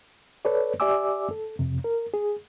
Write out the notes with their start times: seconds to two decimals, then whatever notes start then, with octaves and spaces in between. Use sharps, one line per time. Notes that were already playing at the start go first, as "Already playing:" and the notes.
0.45 A4 B4 C#5 D5
0.80 G4 D5 E5 G#5 D6 E6
1.31 A4
1.59 F2 C3
1.84 A#4
2.14 G#4